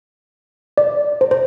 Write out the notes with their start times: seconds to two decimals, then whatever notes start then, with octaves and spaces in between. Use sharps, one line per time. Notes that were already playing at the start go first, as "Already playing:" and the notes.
0.78 D5
1.21 C5
1.31 C5